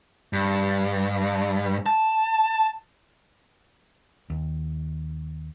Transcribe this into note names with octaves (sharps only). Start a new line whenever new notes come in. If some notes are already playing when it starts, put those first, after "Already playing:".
G2
A5
D#2